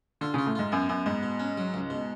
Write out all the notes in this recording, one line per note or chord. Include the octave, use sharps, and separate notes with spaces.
D3 F4
C#3 F4
A2
G#2 F4
F#2 B3
F#2 B3
G#2 B3
B2
C#4
F#3
C#2
B2